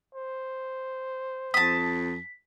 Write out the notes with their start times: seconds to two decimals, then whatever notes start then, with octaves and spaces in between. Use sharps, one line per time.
0.15 C5
1.54 F2 A5 D#6 B6